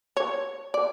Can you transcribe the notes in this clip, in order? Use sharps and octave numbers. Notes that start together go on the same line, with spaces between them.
C#5
D5